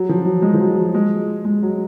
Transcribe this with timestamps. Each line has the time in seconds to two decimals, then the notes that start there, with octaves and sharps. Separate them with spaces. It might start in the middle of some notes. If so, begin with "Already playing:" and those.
Already playing: F#3
0.09 F3
0.25 F#3
0.42 G#3
0.54 F3
0.60 F#3
0.77 F#3
0.94 G#3
1.45 G#3
1.63 F#3